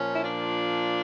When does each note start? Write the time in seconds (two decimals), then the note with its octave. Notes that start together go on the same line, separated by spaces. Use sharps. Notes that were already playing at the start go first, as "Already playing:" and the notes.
Already playing: A#2 F3 C#4
0.15 E4
0.23 D4 F4